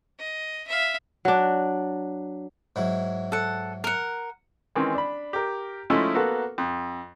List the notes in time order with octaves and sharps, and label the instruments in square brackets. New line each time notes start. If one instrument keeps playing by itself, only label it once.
[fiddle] D#5
E5 F5
[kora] F#3 D4
[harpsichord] G#2 F#3 E4
[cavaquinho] A4 F#5
A#4 F#5
[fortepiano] D#3 E3 G#3 C4 C#4
D4 B5
G4 A#4
F3 G#3 A3 C#4 D#4 E4
A#3 B3 F#4 A4
F2